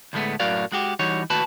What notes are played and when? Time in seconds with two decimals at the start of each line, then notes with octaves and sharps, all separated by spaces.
0.13 D2 A2 G#3 A3 B3
0.40 F#2 A2 F#4 A#4 D5 F5
0.72 G#3 F#4 G4
0.99 E3 G3 D#4 F#4 C#5
1.30 D#2 A2 F#4 B4 A5 B5